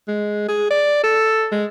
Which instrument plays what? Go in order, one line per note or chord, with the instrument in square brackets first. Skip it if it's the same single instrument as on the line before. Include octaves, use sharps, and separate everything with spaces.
[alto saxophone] G#3
G#4
D5
A4
G#3